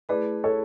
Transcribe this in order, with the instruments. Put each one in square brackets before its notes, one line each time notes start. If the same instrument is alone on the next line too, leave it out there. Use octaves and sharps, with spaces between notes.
[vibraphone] A3 E4 G#4 [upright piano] B4 D5
[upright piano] A4 C#5